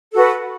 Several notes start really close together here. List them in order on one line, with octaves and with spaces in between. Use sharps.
A4 F#4 B4